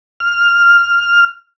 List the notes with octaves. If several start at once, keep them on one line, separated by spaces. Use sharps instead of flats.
F6